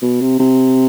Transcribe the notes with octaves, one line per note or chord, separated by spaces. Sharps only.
B2
C3
C3